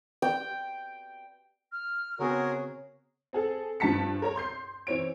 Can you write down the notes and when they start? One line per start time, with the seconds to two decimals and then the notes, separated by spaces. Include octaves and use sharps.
0.22 G5
1.71 F6
2.19 C#3 B3 C4 F#4 G#4 A#4 C#5
3.33 C4 G#4 A4
3.80 G2 F3 G3 A5 B6 C#7
4.22 A#4 C#5 A#5
4.36 C6 G6 C7
4.87 E3 C4 C#5 D7